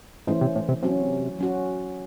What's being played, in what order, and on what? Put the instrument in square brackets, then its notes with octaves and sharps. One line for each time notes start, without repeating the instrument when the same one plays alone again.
[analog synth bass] G#2 [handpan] E3 A3 C#4 E4 C5
[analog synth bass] C3
A2
C3
[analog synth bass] C3 [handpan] F#3 C#4 F#4
[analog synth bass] C#3
C3
[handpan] F#3 C#4 F#4